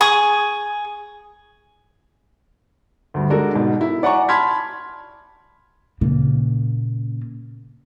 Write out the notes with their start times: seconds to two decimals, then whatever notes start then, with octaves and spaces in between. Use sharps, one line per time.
0.01 G#4 C#6 D#6
3.14 D2 G2
3.30 G#3 D4 F#4 A4 A#4
3.53 G#2 B2
3.81 E4
4.03 D5 F#5 G#5 A#5 C#6 D6
4.29 A5 B5 C6 F6 G#6 B6
6.01 A#2 C#3